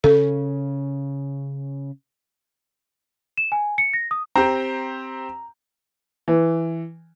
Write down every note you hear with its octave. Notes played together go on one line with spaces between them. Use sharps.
C#3 C#4 A4
E7
G#5
C#7
A#6
D#6
C4 G4 A#5
E3